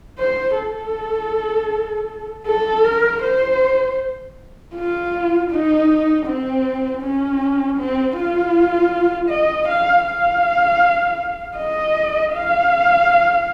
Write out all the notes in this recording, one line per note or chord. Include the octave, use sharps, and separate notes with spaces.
C5
A4
A4
A#4
C5
F4
D#4
C4
C#4
C4
F4
D#5
F5
F5
D#5
F5